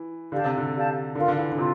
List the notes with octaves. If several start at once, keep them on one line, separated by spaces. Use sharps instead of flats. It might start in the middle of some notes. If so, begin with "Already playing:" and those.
Already playing: E3
D3 G4 D5 F5 A5
C3
D3
G4 D5 F5 A5
D3 F4 A#4 F5
D3
E3
D3
C3 F4